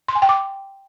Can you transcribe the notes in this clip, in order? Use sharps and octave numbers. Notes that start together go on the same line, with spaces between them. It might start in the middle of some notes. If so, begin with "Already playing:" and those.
C6
G#5
G5
D6